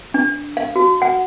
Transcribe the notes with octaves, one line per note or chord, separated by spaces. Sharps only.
D4
F5
F#4
F#5